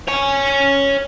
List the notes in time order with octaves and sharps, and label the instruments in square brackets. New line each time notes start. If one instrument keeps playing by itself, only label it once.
[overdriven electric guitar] C#5 G#5